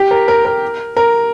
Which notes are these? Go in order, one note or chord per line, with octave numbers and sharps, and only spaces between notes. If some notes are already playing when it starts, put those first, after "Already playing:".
Already playing: G4
A#4
A#4
A#4
A#4